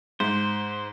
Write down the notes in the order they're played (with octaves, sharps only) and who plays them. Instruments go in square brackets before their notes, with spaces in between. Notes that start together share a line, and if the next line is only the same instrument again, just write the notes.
[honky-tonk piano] G#2 [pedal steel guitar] C5